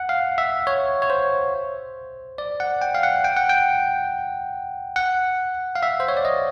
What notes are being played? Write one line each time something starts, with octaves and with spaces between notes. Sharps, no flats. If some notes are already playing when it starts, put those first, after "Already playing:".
Already playing: F#5
F5
E5
C#5
C#5
C5
D5
F#5
G5
F5
F#5
G5
F#5
G5
F#5
F5
E5
C5
C#5
D5
D#5